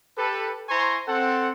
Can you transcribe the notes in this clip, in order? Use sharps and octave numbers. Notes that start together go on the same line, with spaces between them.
G4 A4 B4
E4 C5 G#5 A#5 C6 C#6
C4 A4 F#5